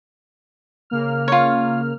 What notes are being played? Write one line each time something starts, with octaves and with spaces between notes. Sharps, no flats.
C#3 A#3 F6
F4 C#5